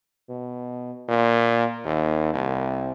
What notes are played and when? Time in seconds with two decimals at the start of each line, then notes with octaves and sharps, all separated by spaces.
0.29 B2
1.09 A#2
1.85 D#2
2.34 C2